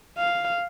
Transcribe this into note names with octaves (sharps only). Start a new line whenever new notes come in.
F5